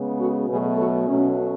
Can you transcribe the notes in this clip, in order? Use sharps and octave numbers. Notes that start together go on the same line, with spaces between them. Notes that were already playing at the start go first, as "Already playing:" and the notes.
Already playing: C#3 G#3 B3
F#4 A4
B2 F#3 A3 G#4 B4
F#4 A4
B2 F#3 A3 C#4